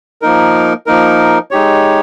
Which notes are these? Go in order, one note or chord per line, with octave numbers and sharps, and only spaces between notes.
F3 A#3 D#4 A#4
F3 A#3 D#4 A#4
G#3 D#4 G4 C#5